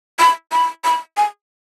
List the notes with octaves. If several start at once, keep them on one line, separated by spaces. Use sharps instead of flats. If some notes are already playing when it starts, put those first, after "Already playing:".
B5
B5
B5
G#5